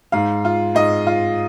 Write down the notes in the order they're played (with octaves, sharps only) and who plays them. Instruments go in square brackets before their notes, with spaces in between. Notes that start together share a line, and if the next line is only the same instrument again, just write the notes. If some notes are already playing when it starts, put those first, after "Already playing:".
[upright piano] G#2 F5
F4
G#2 D#5
F4